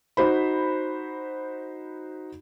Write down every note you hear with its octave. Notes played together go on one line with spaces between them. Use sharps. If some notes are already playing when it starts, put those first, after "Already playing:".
D#4 F#4 C5 B5